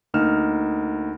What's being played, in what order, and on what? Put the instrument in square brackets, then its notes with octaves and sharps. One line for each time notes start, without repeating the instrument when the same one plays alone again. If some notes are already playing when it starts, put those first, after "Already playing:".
[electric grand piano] D2 A#3 D#4 F6 E7